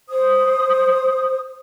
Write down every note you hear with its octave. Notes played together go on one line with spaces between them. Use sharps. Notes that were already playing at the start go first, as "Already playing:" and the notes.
C5 D#6